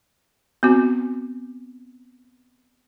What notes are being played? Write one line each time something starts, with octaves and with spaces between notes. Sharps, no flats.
B3 C4 F#4 G#5